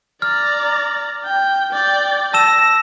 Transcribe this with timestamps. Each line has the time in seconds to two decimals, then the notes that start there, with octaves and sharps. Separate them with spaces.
0.22 D5 A#5 F6
1.25 G5
1.73 D5 G5
2.34 A5 E6 A#6 E7